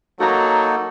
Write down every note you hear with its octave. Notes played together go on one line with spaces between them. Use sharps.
F#3 A#3 D#4 F#4 A4 A#5